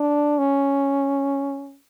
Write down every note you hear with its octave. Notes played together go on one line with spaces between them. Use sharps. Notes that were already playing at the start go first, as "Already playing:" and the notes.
Already playing: D4
C#4